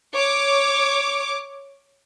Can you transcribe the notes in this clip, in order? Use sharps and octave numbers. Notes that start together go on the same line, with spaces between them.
C#5 D6